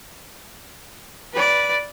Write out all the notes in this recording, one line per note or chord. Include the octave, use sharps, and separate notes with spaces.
B4 D5